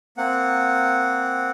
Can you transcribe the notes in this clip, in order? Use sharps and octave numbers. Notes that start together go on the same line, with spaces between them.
A#3 C4 F#5